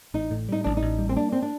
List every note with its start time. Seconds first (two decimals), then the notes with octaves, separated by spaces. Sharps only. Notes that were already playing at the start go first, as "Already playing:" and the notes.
0.14 A1 D#4
0.31 A2
0.49 G3 D#4
0.64 A1 D4
0.77 D#4
0.82 A1
0.99 G3
1.09 C4
1.16 A#3 D4
1.32 C4
1.42 D4